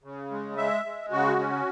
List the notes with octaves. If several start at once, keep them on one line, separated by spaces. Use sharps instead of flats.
C#3
G#3
G#3 E5
G#3
C#3 F#4
C#4